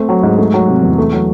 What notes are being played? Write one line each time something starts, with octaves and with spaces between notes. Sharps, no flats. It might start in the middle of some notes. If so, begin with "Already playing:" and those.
Already playing: A3 C4
F#3
G#2
A3
F#3
C3
E2
A3
F#3